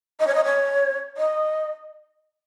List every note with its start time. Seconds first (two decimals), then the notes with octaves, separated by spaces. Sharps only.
0.20 D#5
0.27 C#5
0.34 D#5
0.44 C#5
1.17 D#5